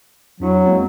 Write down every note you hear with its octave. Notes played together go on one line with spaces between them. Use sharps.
F2 F#3 D4 E4
G#3 A#3 C4